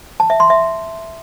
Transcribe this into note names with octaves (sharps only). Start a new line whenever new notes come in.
A5
E5
C6
E5